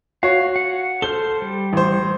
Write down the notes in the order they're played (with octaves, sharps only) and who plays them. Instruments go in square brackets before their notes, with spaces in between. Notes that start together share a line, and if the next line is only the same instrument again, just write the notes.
[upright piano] F#4 C#5 [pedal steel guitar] F5
[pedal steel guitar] F#5
[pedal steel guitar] A4 C5 F6 [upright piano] G7
[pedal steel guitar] G3
[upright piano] A1 C5